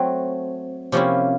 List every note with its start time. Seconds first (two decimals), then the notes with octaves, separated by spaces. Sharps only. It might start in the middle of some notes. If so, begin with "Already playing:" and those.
Already playing: F#3 A3 C4
0.92 C3 F3 A#3 C#4 E4